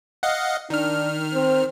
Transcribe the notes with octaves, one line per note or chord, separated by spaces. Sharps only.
D#5 F5 F#5
D#3 D4 F6
C4